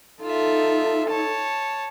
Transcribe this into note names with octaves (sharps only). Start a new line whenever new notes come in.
D#4 F4 A4 E5
C#5 A5